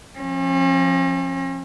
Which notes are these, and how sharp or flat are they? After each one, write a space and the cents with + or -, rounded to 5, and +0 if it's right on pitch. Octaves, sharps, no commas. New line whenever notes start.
F3 +0 C#4 -45